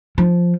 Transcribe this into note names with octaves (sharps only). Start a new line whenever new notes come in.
F3